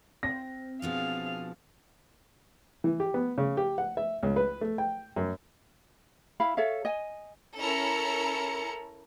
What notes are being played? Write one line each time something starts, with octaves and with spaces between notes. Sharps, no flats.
C4 A#6
B2 F3 D4 G#4 F5
E3
G4
B3
C#3
G4
F#5
E5
C#2
B4
A3
G5
F#2
E4 F5 B5
A4 C#5 E5 F5
D#5 G#5
C#4 E4 A4 A#4 A#5 C#7